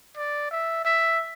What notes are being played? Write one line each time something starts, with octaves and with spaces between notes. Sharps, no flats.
D5
E5
E5